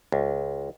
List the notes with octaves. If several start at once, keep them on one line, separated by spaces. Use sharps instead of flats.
C#2